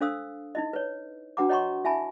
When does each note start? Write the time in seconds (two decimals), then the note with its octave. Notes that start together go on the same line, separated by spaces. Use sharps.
0.01 D4 A4 C5 F5 D#6 E6
0.55 D#4 E4 D#5
0.73 B4 C#5
1.37 D4 F#4 B4 F#5 A#5 D6
1.49 C#5 D#5 F#5 A#5 C6 C#6
1.85 E4 E5 G#5 A5 B5